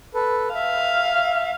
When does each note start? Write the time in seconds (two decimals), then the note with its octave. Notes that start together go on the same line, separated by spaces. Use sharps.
0.14 A4 B4
0.55 E5 F5